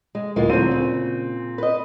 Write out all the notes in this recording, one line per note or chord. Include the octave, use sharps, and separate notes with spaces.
G#3
D1 G#3 A#3 F4
A#2 D3 F#3 C4 D#7
C#3
B4 D#5